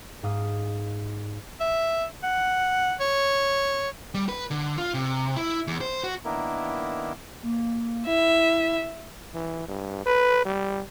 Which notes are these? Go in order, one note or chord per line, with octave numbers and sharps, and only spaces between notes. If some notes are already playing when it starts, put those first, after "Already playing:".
G#2 F5 D#6
E5
F#5
C#5
G3
B4
D3
F4
C3
E4
E2
C5
F#4
D#3 A#3 B3 D4 E4 A#4
A#3
E4 E5
E3
G2
B4
G3